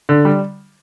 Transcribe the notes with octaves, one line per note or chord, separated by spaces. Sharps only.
D3
G3